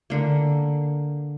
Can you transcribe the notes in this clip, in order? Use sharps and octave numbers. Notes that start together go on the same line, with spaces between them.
D3 A#3